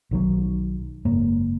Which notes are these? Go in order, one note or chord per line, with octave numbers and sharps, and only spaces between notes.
B1 D#3 F3 F#3
F#1 G#2 A#3